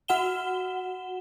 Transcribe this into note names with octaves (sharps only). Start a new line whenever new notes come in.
F#4 F#5 E7 G7